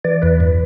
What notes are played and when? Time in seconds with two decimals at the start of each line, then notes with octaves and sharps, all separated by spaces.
0.04 E3 D5
0.22 E2 B4
0.40 G2